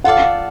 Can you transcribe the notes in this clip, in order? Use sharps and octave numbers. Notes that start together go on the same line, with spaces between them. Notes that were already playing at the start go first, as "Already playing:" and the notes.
F4 A4 D5 F5 F#5